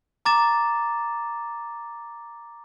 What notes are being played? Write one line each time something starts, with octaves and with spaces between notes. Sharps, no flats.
A#5 D6 A6 E7